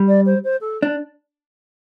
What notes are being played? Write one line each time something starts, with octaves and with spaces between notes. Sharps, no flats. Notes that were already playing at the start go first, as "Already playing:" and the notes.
Already playing: G3
D5
C5
C5
A4
D4